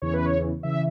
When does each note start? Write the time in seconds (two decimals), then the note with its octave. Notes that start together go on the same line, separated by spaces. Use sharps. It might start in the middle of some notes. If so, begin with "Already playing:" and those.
0.02 E2 C#3 E3 C#5
0.14 B4
0.26 C#5
0.63 C#3 E3 E5